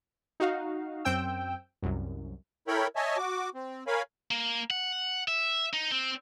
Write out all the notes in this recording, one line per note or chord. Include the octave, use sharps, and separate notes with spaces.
D#4 F#4 F5
F#2 C4 G5 E6
C2 F#2
E4 A4 A#4 C#5 G5 B5
C#5 D#5 E5 G#5 A5
F#4 D6
C4
A#4 C#5 F5 G#5 B5
A#3
F#5
E5
D#4
C4